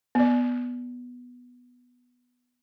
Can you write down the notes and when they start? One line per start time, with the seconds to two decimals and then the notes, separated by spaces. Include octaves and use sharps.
0.15 B3 D5